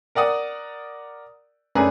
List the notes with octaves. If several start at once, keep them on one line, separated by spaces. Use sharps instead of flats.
A#4 D5 F#5 D#6
F#2 A3 D4 G#4 B4 A#5